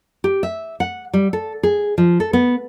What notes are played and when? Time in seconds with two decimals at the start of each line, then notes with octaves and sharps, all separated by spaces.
0.24 G4
0.43 E5
0.80 F#5
1.14 G3
1.33 A4
1.63 G#4
1.98 F3
2.20 A4
2.33 B3